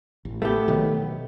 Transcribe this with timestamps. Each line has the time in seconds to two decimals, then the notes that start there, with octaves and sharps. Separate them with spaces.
0.25 A1
0.42 A3 B3 G4
0.68 B2 D#3 F#3